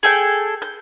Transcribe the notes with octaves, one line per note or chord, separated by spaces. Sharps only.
G#4 A4 G5
G6